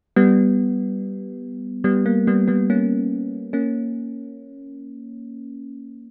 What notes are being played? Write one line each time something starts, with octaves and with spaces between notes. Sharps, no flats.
G3 B3
G3 B3
A#3
G3 B3
G3 B3
A#3 C#4
A#3 C#4